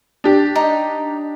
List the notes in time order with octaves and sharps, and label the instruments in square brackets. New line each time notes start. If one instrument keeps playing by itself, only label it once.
[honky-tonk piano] D4 G4
[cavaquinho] D#4